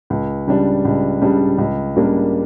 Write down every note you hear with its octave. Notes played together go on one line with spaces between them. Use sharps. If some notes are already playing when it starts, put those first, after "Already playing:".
C#2
C#3 G3 D4
C#2
C#3 G3 D4
C#2
C#3 G3 A#3 D4